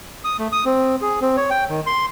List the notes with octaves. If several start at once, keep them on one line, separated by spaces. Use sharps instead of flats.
D#6
A3
D#6
C4
G#4
C4
C#5
G5
D#3
C6